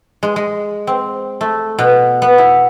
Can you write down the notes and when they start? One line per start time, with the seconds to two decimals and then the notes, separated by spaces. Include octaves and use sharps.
0.23 G#3
0.36 G#3
0.87 C4
1.41 A3
1.79 B2
2.22 B3
2.38 E4